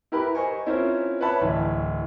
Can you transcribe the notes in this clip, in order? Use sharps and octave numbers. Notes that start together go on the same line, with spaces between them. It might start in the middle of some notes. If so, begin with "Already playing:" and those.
E4 G4 A#4 B4 B5
A#4 C5 D#5 G#5 C#6
C4 C#4 E4 F4 A#4 C5
B4 C#5 D5 E5 A5 B5
D1 E3